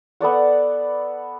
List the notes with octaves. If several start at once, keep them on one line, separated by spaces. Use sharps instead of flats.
B3 A4 D5 F#5